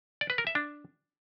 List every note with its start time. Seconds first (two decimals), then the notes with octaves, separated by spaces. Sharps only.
0.21 D5
0.30 B4
0.38 A#4
0.47 E5
0.55 D4